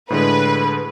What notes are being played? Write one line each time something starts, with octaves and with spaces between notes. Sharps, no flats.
A2 D3 G#3 B4